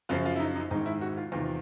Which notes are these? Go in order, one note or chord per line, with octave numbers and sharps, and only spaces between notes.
F#2 C#3 F3 F4
F4
E4
D#4
D#4
G#2 D#3 D#4
E4
F#4
F4
E2 C3 D#3 F4
F4